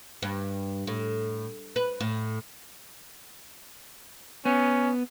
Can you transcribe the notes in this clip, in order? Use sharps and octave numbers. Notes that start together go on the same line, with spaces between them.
G2
A2
B4
A2
B3 C#4